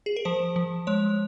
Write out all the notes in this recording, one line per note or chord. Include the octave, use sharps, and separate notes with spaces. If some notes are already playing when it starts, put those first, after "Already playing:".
G#4
A#4
F3 C5
F3
G#3 C#5